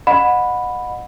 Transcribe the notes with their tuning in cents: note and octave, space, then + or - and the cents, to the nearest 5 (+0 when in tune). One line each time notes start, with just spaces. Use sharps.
D#5 -25 F#5 -25 B5 +0